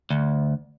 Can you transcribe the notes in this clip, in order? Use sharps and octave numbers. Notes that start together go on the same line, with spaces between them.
D2